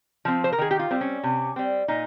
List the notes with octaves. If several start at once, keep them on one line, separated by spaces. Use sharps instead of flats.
F3 C4
C5
A#4
D#3 G#4
G4
F4
G3 C4
C#4
C3
G3 C4
A#2 D#4